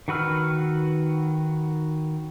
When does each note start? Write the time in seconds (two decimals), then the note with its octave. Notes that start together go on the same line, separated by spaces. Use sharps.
0.08 D#3 F#4 B4 E6 F6